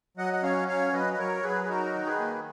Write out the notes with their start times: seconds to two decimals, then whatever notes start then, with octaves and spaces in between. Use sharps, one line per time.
0.17 F#3 D#5 F#5
0.33 F#5
0.43 C#4 C#5 F5
0.68 F#3 C#5 F5
0.93 F#3 B4 D#5
1.14 D#5
1.18 F#3 A#4 C#5
1.43 F#3 G#4 B4
1.64 G#4
1.68 D#4 F#4 A#4
1.93 D#3
2.06 G#4 B4
2.19 A#3